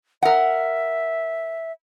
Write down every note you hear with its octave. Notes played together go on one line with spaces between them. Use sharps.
A#4 E5 F#5